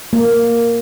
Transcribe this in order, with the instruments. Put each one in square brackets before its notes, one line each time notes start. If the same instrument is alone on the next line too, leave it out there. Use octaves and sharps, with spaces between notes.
[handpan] A#3